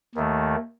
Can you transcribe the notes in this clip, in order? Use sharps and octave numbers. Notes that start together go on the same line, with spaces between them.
D#2 D#3 A3